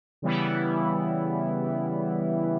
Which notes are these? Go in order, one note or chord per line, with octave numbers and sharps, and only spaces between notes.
C#3 E3 G3 B3 E4